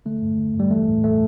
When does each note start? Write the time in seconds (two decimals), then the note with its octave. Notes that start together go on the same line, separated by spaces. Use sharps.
0.06 D3 A3
0.22 G2
0.38 D3
0.54 G2
0.60 G3
0.71 E3 A3
0.88 A2
1.04 E3 A3